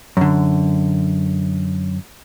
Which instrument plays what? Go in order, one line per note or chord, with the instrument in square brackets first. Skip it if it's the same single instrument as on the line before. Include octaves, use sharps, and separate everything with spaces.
[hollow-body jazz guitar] F#2 D3